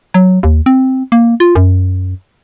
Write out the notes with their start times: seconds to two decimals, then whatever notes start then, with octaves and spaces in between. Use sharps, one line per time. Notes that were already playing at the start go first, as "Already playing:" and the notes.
0.14 F#3
0.43 D#2
0.66 C4
1.12 A#3
1.40 F4
1.55 F#2